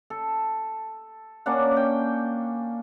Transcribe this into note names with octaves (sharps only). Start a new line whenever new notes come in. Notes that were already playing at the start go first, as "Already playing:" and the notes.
A4
A#3 C#4 D4 F#5
G5